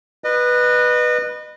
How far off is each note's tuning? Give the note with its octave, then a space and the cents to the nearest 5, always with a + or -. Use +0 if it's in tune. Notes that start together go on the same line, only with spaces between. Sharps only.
B4 -5 D#5 -30